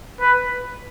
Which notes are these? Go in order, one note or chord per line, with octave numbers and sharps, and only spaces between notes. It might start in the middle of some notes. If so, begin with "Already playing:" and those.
B4